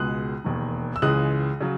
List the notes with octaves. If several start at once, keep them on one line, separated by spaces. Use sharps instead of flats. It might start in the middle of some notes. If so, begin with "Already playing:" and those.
Already playing: C#2 B2 G#3 D#6 F#6
E1 D#2 D#3
E6
C#2 C#3 E3 G#3 D#6 F#6
C#3 F#3